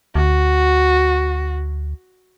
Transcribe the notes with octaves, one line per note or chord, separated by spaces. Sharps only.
D2 F#4